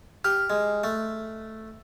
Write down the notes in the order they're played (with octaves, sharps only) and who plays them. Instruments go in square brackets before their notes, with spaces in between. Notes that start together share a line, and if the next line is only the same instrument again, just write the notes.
[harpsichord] G4 [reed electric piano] F6
[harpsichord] G#3
A3